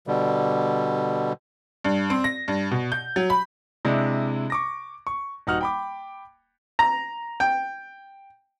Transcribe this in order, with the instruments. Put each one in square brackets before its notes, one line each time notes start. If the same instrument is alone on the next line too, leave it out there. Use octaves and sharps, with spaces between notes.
[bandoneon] B2 D3 G3
[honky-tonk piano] G2
C4
A#6
G2
B2
G6
F#3
B5
[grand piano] C3 G#3 D4 E4
C#6 D6 A#6
C#6
D#1 D#4 F#4 F#5 F6
G5 B5 D6
[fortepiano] A#5
G5